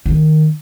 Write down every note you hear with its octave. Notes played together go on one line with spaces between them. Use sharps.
D#3